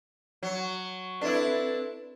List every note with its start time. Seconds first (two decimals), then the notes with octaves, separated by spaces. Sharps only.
0.43 F#3
1.21 C4 D4 E4 A4 B4